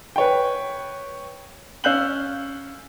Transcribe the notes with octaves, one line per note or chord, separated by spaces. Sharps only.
B4 C#5 G5
C#4 F5 E6 F#6 G6 F#7